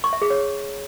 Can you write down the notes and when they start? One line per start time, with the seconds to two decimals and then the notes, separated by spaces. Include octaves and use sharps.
0.04 C#6
0.13 E5
0.22 G#4
0.30 C#5